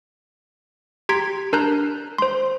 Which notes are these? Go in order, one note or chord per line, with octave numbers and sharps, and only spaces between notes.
G4 A#5 C6 G#6 B6 D7
D4 A#4 A5 A#5 F#6 G6
C5 C6